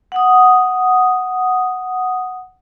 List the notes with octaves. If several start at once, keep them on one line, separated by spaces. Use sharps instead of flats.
F#5 D#6